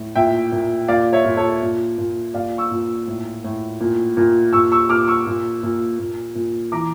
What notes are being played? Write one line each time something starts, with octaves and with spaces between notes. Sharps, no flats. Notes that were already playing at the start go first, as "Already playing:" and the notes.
Already playing: A2
A#2 E5 G5
A#2
A#2 D5 F5
C#5 E5
A#2
A4 C#5
A#2
A#2
A#2 D5 F5
C#6 E6
A#2
A2
A2
A#2
A#2
A#2 C#6 E6
C#6 E6
A#2 D6 F6
C#6 E6
A#2
A#2
A#2
A#2
E3 A#5 D6